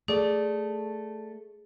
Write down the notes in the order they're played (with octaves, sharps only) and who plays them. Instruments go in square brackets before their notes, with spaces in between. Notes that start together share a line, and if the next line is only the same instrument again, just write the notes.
[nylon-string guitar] A3 D5 [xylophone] G#4